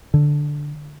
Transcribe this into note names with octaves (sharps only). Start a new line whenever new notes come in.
D3